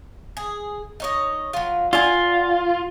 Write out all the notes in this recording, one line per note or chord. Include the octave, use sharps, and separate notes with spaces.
G#4
D#4 C#5 D#5
F#3 F4
F4 D5 F#5 G#5